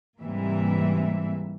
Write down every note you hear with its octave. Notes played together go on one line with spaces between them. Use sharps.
G#2 C3 E3 G3 A#3 E5